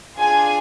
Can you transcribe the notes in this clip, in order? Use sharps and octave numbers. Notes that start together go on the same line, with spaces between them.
D4 F4 G#4 G#5